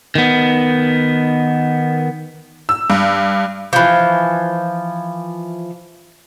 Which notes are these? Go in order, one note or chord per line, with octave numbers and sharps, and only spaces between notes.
D#3 B3
E6
G2
E3 F3